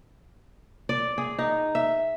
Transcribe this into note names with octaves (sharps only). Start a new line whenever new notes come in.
D5
G#4
D#4
E5